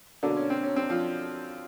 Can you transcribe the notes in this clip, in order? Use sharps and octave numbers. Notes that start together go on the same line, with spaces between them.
B2 D3 F#3 A#3 D4
C#4
C4
C#4
C4
F3 F4